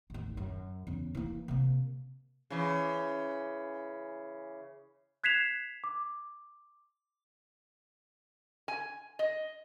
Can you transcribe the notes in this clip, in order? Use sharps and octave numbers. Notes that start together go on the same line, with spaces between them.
A1 D#2
F#2
E2 C#3
E3 A#3
C3 A#3
C#3 E3
F#6 G#6 B6 C7 E7 F7
D6
G#5
D#5